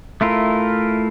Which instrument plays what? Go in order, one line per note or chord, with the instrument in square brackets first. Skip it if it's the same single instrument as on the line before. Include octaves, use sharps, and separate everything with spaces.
[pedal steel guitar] A3 E4 F4 A#4